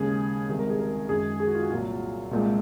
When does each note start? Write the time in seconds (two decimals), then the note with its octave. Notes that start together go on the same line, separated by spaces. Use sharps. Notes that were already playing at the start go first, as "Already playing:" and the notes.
Already playing: D#2 C#3 G#3 G#4
0.48 C2 C3 D#3 G#3
0.59 A#4
0.69 G#4
0.80 A#4
1.09 F#2 D#3 G#3 G#4
1.40 G#4
1.47 F#4
1.55 F4
1.63 F#4
1.70 C2 A#2 F#3 F4
2.31 C2 A#2 G#3